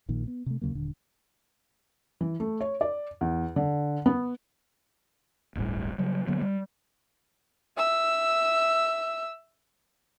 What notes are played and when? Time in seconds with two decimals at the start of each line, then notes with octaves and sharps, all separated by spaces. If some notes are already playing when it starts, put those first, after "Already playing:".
0.09 A#1 A#2 D#3
0.27 B3
0.46 C3 A3
0.61 D#2 C#3 F#3 A#3
0.75 D#1 D3
2.21 E3
2.40 A3
2.61 C#5
2.81 D5
3.21 E2
3.56 D3
4.06 B3
5.55 D1 G1 A2 G3
5.98 C#3 F#3 G3
6.27 D3 F#3 A#3 B3
6.42 G3
7.76 E5 E6